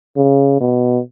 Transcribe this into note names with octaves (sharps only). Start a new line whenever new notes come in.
C#3
B2